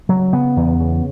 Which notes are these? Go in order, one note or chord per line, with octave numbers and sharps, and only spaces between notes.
C#3 F#3
C#3 B3
E2
C#3